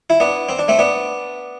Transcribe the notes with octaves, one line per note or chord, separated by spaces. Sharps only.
E4
B3 D4
C4
D4
A3 C4
B3 D4